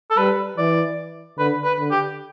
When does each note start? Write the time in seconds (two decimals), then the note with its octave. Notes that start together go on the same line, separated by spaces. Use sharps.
0.10 A4
0.17 G3 B4
0.58 E3 D5
1.38 D3 B4
1.64 B4
1.79 D3
1.91 G4